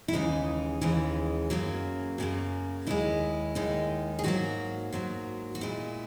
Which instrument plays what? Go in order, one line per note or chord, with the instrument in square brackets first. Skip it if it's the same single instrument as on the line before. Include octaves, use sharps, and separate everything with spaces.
[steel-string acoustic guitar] E4
D#2 C#3 E3 G#3 D#4
D#2 C#3 E3 G#3
F#2 C#3 F#3 A#3
F#2 C#3 F#3 A#3
D#2 D#3 G#3 E4
D#2 D#3 G#3
G#4
G#2 F#3 A#3 F#4
G#2 F#3 A#3
F#4
A#2 G#3 E4